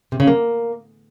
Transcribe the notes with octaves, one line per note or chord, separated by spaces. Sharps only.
C3
C#3
A#3